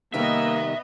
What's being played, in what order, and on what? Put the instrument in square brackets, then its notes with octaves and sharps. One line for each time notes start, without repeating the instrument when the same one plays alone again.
[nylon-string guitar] C3 D#3 G3 [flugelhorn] A#3 [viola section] B3 D#5 [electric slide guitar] E5